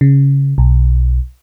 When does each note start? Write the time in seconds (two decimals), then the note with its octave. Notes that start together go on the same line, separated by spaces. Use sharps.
0.01 C#3
0.58 B1